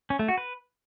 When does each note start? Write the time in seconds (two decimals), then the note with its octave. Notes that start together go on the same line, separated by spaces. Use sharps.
0.10 C#4
0.19 A3
0.28 F#4
0.38 B4